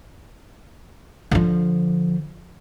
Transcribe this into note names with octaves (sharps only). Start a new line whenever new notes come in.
D3 F3